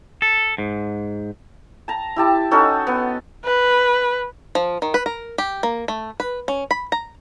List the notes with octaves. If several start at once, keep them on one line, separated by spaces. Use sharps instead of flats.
A4
G#2
A5 A#5
E4 G4 A5
C#4 D#4 F#4 A4
B3
B4
F3
D#3
B4
A#4
G4
A#3
A3
B4
C#4
B5
A#5